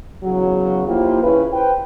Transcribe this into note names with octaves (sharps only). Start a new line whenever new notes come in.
E2 C#3 F#3
F3 A#3 E4 F4 G4
C#3 C#4 E4 B4
B4 C5 G5